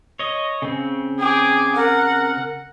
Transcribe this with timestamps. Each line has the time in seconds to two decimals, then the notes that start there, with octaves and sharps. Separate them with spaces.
0.19 C#5 D#5
0.62 C#3 C4
1.20 G#4 G5 D6
1.75 A#4 F#5